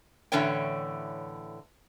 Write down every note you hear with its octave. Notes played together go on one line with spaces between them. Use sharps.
A2 D3 E3 C#4 C#5 G5